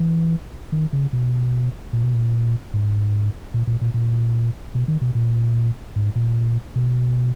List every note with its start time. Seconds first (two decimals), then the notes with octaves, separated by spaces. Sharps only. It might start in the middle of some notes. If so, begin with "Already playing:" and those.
Already playing: E3
0.72 D#3
0.93 C#3
1.13 B2
1.93 A#2
2.03 B2
2.14 A#2
2.74 G#2
3.54 A#2
3.67 A#2
3.81 A#2
3.94 A#2
4.75 B2
4.88 D#3
5.01 B2
5.15 A#2
5.96 G#2
6.16 A#2
6.76 B2